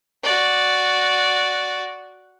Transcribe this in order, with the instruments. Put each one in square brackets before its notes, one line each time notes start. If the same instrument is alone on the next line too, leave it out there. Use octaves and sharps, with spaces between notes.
[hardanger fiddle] F#4 D5